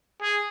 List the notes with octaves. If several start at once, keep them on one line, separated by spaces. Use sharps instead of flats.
G#4